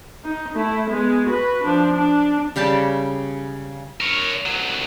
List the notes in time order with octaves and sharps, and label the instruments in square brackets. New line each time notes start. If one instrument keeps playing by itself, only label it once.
[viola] D#4
A3 E4
G#3 B3
F#4 B4
F3 D4
D4
[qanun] C#3 G3 G4 A5
[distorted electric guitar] A#4 C#5
C2 F#3